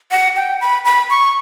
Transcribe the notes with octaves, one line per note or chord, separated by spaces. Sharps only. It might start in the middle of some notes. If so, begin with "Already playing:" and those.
F#5
G5
B5
B5
C#6